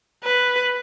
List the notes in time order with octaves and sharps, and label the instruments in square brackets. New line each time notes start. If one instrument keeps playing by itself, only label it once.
[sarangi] B4